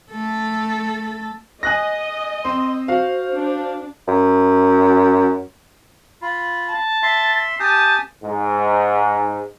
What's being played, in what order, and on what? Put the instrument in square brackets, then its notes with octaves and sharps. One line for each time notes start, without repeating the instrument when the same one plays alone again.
[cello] A3 A4
[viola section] D#5 [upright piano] G#5 F#6 A#6
[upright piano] C4 [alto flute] C6
[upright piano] F#4 F5 [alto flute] C5
[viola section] D4
[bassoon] F#2
[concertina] F4 [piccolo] B5
[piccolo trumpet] A5
[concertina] E5 C6 [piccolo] A6
[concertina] G4 G#5 D#6 [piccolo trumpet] A5 [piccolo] G6
[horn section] G#2